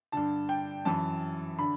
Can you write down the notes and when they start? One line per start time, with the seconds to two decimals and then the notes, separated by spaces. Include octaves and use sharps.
0.12 G2 D3 A5
0.49 G5
0.85 F#2 E3 A5
1.59 D3 B5